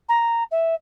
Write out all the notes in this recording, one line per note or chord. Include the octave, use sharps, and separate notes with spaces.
A#5
E5